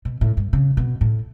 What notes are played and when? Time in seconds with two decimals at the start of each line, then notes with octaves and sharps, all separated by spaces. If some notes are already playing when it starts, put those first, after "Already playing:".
0.05 B2
0.21 A2
0.37 G2
0.53 C#3
0.77 B2
1.01 A2